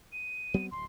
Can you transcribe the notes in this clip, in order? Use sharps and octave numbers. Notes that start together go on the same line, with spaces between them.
D#7
F#3 B3 C4
D1 C2 C6